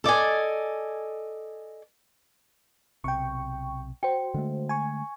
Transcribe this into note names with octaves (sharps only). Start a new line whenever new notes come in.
A4 D5 D#5 G#5
B1 C3 G5 C#6
F#4 C5 G5
D3 G#3 A3
G#5 C#6